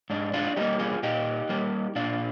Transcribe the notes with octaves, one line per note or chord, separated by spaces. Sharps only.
G#2 D4
D4 F4
G3 A#3 D#4 G4
F4 G#4
A#2 D#4 G4
G3 A#3
A#2 D4 F4